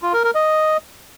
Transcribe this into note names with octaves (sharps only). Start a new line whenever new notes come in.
F4
A#4
A#4
D#5